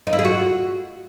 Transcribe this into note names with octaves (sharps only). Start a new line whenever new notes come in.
D#4
E4
G#4
F#4